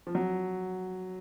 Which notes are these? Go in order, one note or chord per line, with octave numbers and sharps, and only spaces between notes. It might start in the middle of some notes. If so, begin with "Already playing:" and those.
F3
F#3